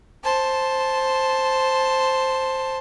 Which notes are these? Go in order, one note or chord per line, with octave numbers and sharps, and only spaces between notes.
C5 A5